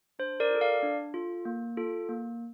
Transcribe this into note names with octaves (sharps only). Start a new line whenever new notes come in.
D4 C5
A#4 D5
F4 A4
D5 F5
D4
F4 A4
A#3
F4 A4
A#3